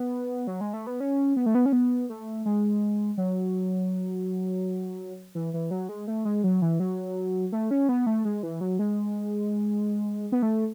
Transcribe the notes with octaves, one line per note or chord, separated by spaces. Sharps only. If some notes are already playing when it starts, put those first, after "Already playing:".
Already playing: B3
F#3
G#3
A3
B3
C#4
B3
A3
B3
C#4
B3
A3
G#3
F#3
E3
E3
F#3
G#3
A3
G#3
F#3
E3
F#3
A3
C#4
B3
A3
G#3
E3
F#3
G#3
B3
A3